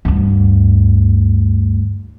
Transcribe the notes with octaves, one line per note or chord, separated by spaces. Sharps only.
D2 G2